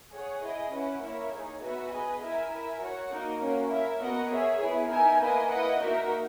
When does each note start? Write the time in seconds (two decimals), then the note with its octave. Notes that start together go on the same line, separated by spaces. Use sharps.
0.13 G#4 C#5 F#5
0.43 E4 G#4 D#5
0.72 C#4 E4 B4 F#5
1.02 A#3 E4 A#4 C#5 E5
1.32 D#4 G#4 C#5
1.62 B3 F#4 B4 E5
1.92 G#4 B4 D#5 G#5
2.22 E4 A#4 E5 G#5
2.51 E4 A#4 E5 G#5
2.81 F#4 C#5 F#5
3.11 A#3 D#4 F#4 A#4
3.41 A#3 C#4 F#4
3.70 E4 A#4 E5
4.00 B3 F#4 A#4 D#5 F#5
4.30 G#4 C#5 E5
4.60 B3 E4 G#4
4.90 D#4 A#4 E5 G#5
5.20 A#3 E4 B4 D#5 G#5
5.49 E4 B4 D#5 F#5
5.80 A#3 D#4 F#4 A#4 E5